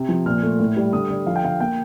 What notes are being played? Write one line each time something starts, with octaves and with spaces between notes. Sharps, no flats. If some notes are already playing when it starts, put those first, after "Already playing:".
Already playing: C3
F3
A#2 F6
A3
A2
G3
D3 D#6
D3
F3 F5
G5
D3 F5
A#3 G5